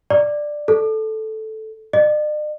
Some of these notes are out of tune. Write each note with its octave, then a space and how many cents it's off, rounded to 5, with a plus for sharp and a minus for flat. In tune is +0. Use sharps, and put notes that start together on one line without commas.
D5 +10
A4 -5
D5 +45